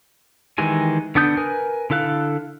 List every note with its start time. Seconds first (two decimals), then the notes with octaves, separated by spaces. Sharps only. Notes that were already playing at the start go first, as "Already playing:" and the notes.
0.58 D#3 E3 G#3 G4 G#5
1.15 D3 B3 D4 D#6 G6
1.37 A#4 B4 G#5
1.90 D3 E4 A4 F5 F#6